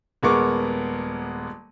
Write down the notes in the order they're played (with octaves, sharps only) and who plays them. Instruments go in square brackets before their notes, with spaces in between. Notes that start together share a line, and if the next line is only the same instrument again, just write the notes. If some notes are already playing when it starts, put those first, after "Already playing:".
[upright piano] D#1 G#3 B3 A#4 C#6 D6